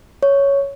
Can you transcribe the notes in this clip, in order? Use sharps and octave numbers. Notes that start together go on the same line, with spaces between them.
C#5